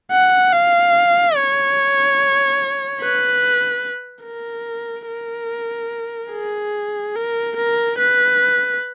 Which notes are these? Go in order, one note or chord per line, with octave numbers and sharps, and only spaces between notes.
F#5
F5
C#5
B4
A#4
A#4
G#4
A#4
A#4
B4